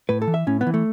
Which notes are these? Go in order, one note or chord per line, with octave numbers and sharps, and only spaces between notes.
A2 B4
A4
E3
E5
A2 C#4
B3
E3
A3